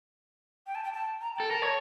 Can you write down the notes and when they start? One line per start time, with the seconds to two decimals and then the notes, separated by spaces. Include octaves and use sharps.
0.67 G5
0.75 A5
0.84 G5
0.94 A5
1.21 A#5
1.36 A4 G5
1.47 A#4 A5
1.62 C#5